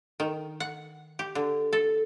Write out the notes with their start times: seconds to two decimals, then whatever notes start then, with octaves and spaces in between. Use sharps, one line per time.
0.20 D#3
0.60 F#5
1.19 G4
1.35 D3
1.73 A4